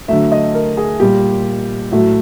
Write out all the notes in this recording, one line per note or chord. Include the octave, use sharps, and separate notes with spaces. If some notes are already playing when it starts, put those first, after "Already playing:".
D3 F#3 A3 E5
D#5
A#4
G#4
A#2 G3 G4
A2 F#3 A3 F#4